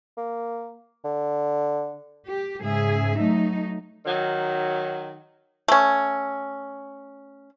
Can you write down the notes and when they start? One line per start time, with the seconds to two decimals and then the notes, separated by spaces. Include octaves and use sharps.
0.18 A#3
1.05 D3
2.28 G4
2.61 G#2 C#3 G#4 E5
3.18 F#3 A3 D#4
4.05 D#3 F#3
5.68 A3 C#4